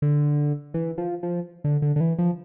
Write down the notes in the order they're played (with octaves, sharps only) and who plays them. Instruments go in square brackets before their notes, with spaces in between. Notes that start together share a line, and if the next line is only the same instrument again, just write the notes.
[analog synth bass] D3
E3
F3
F3
D3
D3
D3
E3
F3